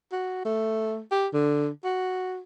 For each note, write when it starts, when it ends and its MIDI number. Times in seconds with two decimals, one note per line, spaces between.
0.12 0.42 66
0.45 1.01 57
1.11 1.27 67
1.33 1.68 50
1.84 2.40 66